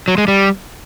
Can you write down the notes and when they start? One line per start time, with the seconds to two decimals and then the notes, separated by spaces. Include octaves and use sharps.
0.08 F#3
0.18 G#3
0.28 G3